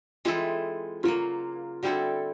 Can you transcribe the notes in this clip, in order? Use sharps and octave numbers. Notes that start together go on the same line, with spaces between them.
E3 G#3 C4 E4 F4 A4
C#3 F#3 A#3 F4
D3 G3 C4 E4 F#4 A4